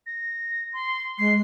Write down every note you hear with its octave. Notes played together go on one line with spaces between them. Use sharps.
A#6
C6
G#3 C7